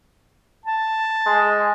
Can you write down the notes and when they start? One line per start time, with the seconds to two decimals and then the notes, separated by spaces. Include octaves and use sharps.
0.66 A5
1.26 G#3